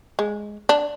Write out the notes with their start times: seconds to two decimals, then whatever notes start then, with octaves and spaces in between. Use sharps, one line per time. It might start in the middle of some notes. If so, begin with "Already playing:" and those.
0.19 G#3
0.69 D4